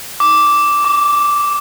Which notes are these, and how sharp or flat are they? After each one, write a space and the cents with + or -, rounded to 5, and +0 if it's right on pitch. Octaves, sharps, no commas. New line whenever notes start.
D6 -5
D6 -45